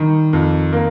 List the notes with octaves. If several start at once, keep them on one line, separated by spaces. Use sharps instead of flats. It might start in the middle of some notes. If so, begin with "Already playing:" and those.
Already playing: D#3 G3
F2
A#3